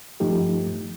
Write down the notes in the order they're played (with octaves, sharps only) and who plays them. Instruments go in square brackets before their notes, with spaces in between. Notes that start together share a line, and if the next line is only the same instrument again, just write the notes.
[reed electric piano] G2 F3 A3 D#4 G4